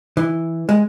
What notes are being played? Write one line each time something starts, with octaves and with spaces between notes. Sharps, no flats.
E3
G#3